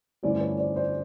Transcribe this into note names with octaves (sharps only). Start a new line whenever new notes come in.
G1 G2 E3 A3 C#4 C5 D5
B4 C#5
C5 D5
C5 D5